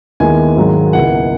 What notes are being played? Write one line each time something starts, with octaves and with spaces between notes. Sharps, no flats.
D#2 D#3 G#3 B3 E4 G#5
G#1 G#2 D#3 F#3
C#2 B2 A#3 E4 F#5